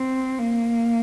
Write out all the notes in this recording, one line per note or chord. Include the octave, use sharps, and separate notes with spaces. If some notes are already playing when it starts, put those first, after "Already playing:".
Already playing: C4
A#3